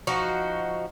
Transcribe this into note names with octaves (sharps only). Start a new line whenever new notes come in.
F3 D#4 F#4